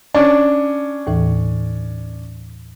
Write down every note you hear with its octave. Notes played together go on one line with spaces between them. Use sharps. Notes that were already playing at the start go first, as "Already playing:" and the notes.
C#4 D4 C#6
D#2 A2 E3